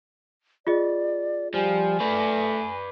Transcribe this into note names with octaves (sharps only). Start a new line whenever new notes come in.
F4 G#4 D5 D#5
F3 G3 G#5
A3 B4 D5